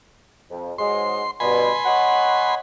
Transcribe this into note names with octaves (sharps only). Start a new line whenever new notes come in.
F2
G#2 F#3 G#3 C6
G2 B2 G#5 B5 C6
C#5 D#5 F#5